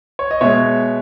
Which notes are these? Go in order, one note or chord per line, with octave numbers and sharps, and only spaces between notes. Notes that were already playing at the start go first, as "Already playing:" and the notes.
C#5
D#5
B2 G#3 C#5 E5